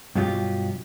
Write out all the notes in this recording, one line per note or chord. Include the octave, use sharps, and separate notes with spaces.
G2 B2 F#3 F4 G4